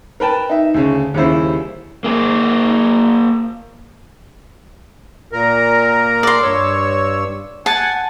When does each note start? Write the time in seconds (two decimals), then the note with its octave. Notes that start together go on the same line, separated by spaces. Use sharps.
0.20 A#4 B4 G5 A5
0.50 D#4 E5
0.74 D2 C#3
1.14 D#2 C#3 G3 E4 C5
2.04 A#3 G#4
5.32 A#2 A#4
6.23 D5 C6
6.43 G2 C#5 E6
7.66 F#5 G#5 A5